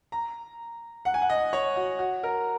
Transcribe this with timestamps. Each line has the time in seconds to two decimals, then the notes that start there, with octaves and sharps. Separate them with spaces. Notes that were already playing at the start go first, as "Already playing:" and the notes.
0.12 A#5
1.05 F#5
1.14 G#5
1.22 F#5
1.29 D#5
1.53 C#5
1.76 F#4
1.99 F#4
2.23 A#4